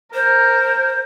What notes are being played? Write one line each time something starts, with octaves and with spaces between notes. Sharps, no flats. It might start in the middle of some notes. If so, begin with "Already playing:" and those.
A#4 C5